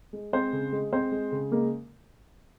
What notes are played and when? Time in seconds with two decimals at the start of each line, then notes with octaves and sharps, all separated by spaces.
0.13 G#3
0.33 G#3 C4 C5
0.53 C#3
0.72 G#3
0.92 G#3 C4 C5
1.12 G#3
1.32 C#3
1.52 G#3 A#3 A#4